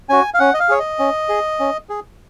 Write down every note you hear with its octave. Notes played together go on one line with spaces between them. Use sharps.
C#4 F#4 G#5
F5
C#4 F#5
D#5
F5
G#4 C#5
D#5
C#4
G#4
C#4
G#4